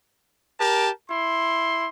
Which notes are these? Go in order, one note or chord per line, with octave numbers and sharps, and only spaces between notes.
G4 A#4 A5
E4 C6